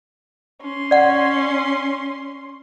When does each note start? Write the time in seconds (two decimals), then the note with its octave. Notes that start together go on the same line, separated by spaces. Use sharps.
0.61 C#4 C6
0.91 D5 F#5